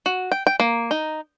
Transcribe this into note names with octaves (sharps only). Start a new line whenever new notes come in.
F#4
G5
G5
A#3
D#4